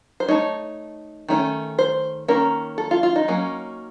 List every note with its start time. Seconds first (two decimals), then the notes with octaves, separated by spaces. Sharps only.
0.20 C5
0.28 A3 D#4 C#5
1.28 D#3 A3 C#4
1.79 C5
2.28 D#3 A#3 C#4 A#4
2.78 A4
2.91 F4
3.03 F4
3.16 D#4
3.28 F#3 A#3 C#4